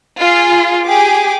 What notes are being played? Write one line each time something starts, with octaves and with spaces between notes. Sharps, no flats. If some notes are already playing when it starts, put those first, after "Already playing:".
F4 G#4
G4 G#4 D6